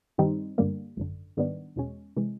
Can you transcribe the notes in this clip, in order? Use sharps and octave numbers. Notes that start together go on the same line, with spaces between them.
G2 D#3 G3 C4 D#4
G1 G2 D3 G3 A#3
G#1 F#2 D3
G#2 D#3 G3 B3 D4
E2 B2 G#3 C#4
C3 E3 G#3